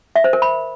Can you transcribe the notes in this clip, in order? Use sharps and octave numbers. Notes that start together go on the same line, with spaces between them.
E5
C5
A#4
B5